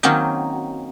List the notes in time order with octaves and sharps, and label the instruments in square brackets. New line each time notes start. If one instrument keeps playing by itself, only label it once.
[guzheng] D#3 F#3 A#3 C4 C#4 D#4